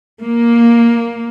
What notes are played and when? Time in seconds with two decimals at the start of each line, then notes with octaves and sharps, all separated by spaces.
0.22 A#3